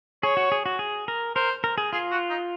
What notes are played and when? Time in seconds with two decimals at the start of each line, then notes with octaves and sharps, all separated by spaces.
0.23 G#4 C#5
0.37 F#4
0.52 G#4
0.66 F#4
0.79 G#4
1.08 A#4
1.35 A#4 C5
1.64 A#4
1.78 G#4
1.92 F4 G#4
2.11 F#4
2.30 D#4